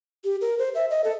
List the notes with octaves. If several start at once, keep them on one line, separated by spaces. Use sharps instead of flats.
G4
A#4
C5
E5
D#5
A4